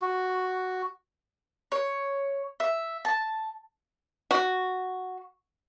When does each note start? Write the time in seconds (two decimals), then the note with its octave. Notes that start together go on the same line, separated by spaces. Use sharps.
0.02 F#4
1.72 C#5
2.60 E5
3.05 A5
4.31 F#4